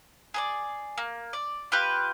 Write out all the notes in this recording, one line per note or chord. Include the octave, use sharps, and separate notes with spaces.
G#4 A4 D5
A#3
D5
F4 G4 B4 G5